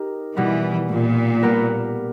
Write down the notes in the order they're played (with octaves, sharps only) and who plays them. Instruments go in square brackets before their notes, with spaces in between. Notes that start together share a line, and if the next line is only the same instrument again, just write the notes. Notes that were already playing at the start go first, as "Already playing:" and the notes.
Already playing: [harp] D#4 G4 A#4
[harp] B2 G3 B3 [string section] E3
[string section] A#2
[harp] G3 B3 G4 A#4